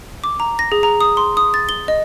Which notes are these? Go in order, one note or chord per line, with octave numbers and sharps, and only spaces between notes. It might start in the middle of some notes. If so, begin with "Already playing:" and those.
D6
A#5
A#6
G#4
A#5
D#6
C6
D#6
A6
G7
D#5